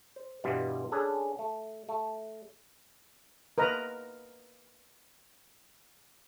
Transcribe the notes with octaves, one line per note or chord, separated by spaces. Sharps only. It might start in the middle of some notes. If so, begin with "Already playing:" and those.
C5
G2 B2 E3 G3 B3 F4
C#4 D4 G#4 A4 B4
A3
A3
A#4 B4 D#5 A#5